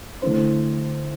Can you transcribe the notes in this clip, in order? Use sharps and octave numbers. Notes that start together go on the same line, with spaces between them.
D3 A3 E4 C5